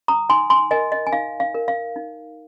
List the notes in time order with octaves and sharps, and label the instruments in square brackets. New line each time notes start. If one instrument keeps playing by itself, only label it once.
[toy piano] A#5 D#6
D#4 G#5 C6
G#5 C6
A#4 D#5 G#5
D#5
G#5
D#4 F5
F5
A#4
F5
D#4